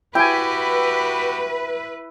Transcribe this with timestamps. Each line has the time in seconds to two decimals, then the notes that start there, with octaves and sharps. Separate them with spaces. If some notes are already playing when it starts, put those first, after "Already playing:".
0.15 E4 F#4 G4 B4 G5 G#5